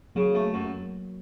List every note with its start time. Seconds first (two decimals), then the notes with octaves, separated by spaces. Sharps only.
0.15 C#3 F#3 A#3
0.35 A3
0.54 F#2